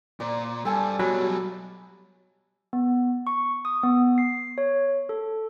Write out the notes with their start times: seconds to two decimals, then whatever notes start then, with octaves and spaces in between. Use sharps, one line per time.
0.20 A#2 C5 D5
0.65 G2 A4 G#5 A5
0.99 B2 F#3 G3 B5
2.73 B3
3.27 C#6
3.65 D#6
3.83 B3
4.18 C7
4.58 C#5
5.09 A4